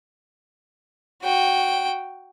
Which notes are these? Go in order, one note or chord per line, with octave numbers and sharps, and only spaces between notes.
F#4 G5